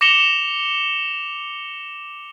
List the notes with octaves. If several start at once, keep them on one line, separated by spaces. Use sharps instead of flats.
D6 A#6 C#7 E7 F7 G7